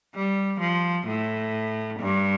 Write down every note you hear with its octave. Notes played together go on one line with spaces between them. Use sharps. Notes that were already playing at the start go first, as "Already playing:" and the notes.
G3
F3
A2
G2